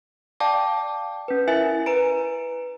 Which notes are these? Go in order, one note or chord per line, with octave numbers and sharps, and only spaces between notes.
D5 F5 G5 A5 D6
C#4 B4
E4 A#4 E5 G#5
B4 G#5 A#5 D7